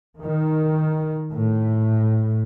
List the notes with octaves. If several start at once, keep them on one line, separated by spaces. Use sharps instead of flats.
D#3
A2